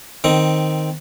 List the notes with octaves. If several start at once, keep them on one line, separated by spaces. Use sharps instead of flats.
D#3 C4